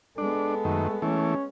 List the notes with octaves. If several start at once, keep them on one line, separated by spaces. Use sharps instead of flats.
G#3 B3 D4 A4
F#2 D#3 A3
E3 A3 C#4